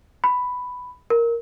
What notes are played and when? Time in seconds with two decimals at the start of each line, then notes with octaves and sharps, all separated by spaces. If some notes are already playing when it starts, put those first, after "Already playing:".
0.24 B5
1.10 A#4